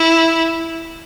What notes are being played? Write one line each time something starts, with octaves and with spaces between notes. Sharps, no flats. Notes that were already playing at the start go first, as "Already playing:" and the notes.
Already playing: E4